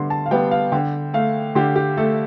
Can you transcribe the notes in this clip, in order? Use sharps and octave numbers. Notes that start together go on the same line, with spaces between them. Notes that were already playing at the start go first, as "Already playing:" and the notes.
Already playing: D3 G3 B3 C6
A5
F5
G3 B3 G5
F5
D3 G5
A3 F5
D3 G4
G4
A3 A4